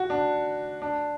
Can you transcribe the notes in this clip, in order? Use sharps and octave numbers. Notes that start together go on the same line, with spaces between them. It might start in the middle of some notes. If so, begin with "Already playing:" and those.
Already playing: F#4
D4
D4